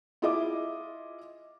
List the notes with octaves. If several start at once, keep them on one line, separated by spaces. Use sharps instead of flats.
E4 F4 G#4 D#5 E5 D6